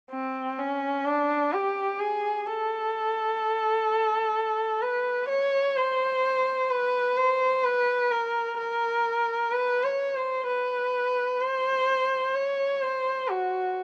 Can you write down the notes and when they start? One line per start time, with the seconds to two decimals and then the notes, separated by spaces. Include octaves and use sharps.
0.11 C4
0.59 C#4
1.05 D4
1.53 G4
2.00 G#4
2.47 A4
4.82 B4
5.29 C#5
5.76 C5
6.70 B4
7.17 C5
7.64 B4
8.12 A#4
8.58 A#4
9.52 B4
9.84 C#5
10.16 C5
10.47 B4
11.41 C5
12.35 C#5
12.82 C5
13.28 F#4